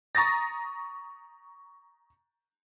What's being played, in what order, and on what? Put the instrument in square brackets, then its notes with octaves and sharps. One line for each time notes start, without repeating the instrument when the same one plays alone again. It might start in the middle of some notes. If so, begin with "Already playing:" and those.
[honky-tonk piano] A#5 C#6 D#6 A6 A#6